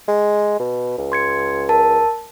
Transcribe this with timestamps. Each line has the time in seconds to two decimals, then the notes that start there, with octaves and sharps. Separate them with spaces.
0.08 G#3
0.60 B2
0.98 C#2
1.12 C6 G#6 C#7
1.69 A#4 A5